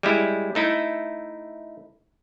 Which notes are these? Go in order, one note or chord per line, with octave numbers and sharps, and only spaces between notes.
G3 G#3 E4
A3 D#4 E4